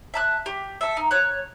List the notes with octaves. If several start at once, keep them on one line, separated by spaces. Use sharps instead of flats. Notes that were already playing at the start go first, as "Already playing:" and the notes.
E5 A5 F#6
G4
A4 E5
D#4
C#5 F#6